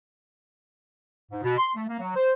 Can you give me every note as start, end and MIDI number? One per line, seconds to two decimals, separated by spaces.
1.32 1.42 44
1.43 1.56 47
1.58 1.71 84
1.76 1.85 57
1.89 1.99 58
2.00 2.12 54
2.16 2.33 72